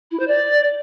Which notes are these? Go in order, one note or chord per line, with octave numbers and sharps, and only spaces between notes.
E4
C5
D5